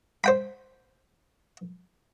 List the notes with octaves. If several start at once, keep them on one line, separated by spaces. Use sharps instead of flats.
C5 G5 B5